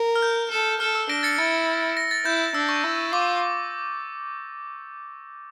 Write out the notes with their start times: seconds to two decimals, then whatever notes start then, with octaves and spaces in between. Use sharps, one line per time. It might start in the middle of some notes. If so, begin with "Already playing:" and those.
Already playing: A#4
0.16 F6
0.22 G6
0.51 A4
0.80 A4 F6
0.95 E6
1.09 D4 A#6 D7
1.23 A6 C#7
1.38 E4 A6 C#7
1.97 A#6
2.11 A6
2.25 E4 G6
2.54 D4 E6
2.69 C#6
2.84 E4
3.12 F4 D6